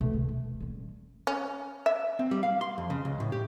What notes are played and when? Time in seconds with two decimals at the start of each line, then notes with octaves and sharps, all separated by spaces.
0.01 B2 A3
0.13 D2
0.29 D#1
0.60 G3 C#4
1.27 C#4
1.86 E5
2.19 C4
2.31 G3
2.43 F5
2.61 C6
2.78 F2
2.90 C#3
3.05 C#2
3.20 A2
3.32 G4